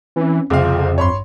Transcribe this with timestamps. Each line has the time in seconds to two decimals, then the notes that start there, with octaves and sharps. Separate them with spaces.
0.16 E3 C4 C#4
0.50 C2 F2 C#3 C4 G#4 F5 D6
0.98 A1 G2 C#5 B5 C6